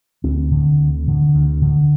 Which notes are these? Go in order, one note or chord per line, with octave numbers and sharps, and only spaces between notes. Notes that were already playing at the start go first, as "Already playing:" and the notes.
D2 C4
D3
D2
D3
D2
D3